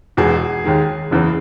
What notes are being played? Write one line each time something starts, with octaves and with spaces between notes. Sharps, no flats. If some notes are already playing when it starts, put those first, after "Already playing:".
E1 E2 B2 G#3 G#4
D#2 D#3 G#3
F#1 E2 C#3 E3